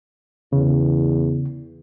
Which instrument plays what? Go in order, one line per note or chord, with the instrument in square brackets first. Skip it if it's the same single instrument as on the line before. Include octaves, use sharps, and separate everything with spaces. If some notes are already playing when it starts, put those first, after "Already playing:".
[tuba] E2 [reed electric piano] C#3